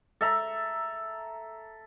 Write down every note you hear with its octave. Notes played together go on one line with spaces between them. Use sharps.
A4 E5 A#5